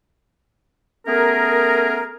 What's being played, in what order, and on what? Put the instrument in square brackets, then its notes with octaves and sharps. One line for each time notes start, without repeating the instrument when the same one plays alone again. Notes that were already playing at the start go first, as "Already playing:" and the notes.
[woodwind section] A3 B3 C#4 G#4 A#4